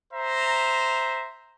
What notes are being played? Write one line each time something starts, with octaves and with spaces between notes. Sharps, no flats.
C5 E5 A#5